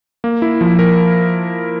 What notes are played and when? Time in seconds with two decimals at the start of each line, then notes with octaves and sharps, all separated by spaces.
0.24 A#3
0.42 E4
0.61 F3
0.79 A#4